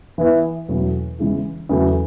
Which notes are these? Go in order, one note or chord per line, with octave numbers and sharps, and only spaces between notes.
E3 B3 E4
E2 B2 F#3 A3 C#4
C#3 E3 G#3 B3 E4
E2 C#3 F#3 A3